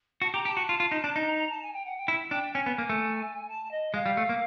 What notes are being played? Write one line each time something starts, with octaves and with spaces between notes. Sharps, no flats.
F#4 A5
G4 A#5
G4 A5
F#4
F4
F4
D#4
D4
D#4
A#5
A#5
A5
G#5
G5
F#5
G5
E4
D4 G5
C#4 G#5
B3
A#3
A3
A5
D#5
G#3 F5
G3
A3
A#3